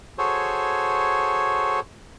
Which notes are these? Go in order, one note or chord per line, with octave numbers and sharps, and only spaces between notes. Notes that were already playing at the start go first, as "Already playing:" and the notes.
F#4 G#4 A4 C5 C#5